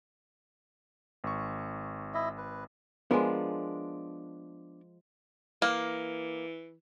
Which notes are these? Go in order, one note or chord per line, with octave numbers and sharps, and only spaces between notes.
G#1 C#6
E4 D#5 E5
B4
F3 G#3 B3 D4 A#4
E3 A#3